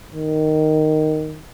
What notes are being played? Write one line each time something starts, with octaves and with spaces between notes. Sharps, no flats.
D#3